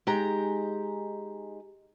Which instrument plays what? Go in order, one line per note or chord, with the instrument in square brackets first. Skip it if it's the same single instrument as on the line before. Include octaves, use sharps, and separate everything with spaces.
[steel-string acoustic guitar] G#3 D#4 G4 A#5